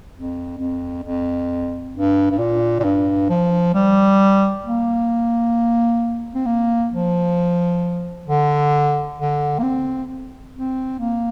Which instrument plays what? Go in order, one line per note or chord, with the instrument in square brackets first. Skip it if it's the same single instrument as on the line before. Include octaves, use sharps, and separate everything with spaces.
[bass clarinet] F2
F2
F2
G2
G2
A#2
A#2
G2
F3
G3
A#3
C4
A#3
F3
D3
D3
A#3
C4
C4
A#3